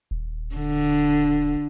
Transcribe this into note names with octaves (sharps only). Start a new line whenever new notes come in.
D#1
D3